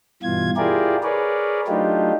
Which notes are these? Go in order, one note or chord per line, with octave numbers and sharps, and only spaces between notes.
G2 B2 E3 F4 G#6
E4 F4 G4 G#4 A#4 D5
G#4 A#4 B4 C#5 D5
F#3 A3 D4 D#4 F4 G4